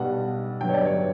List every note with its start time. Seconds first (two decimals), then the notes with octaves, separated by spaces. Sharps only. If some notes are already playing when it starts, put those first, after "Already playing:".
Already playing: B1 B2 G3 F#5
0.61 G1 G2 F#3 G5
0.69 C#5
0.73 D5
0.85 C#5